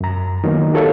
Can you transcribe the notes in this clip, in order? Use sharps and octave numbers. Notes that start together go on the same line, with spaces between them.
F#2 A#5
D#3 F#3 A#3 B3
F#4 G4 A4 A#4 C#5 F5